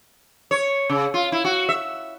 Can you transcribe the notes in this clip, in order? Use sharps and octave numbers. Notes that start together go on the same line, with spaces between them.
C#5
C#3
F4
E4
F#4
E5